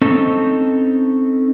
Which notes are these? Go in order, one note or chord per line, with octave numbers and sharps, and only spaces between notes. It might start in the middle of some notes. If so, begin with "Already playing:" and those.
C4 C#4 D#4 A4